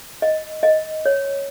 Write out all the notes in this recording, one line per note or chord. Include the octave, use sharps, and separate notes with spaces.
D#5
D#5
C#5